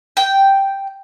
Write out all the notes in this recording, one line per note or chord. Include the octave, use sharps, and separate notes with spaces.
G5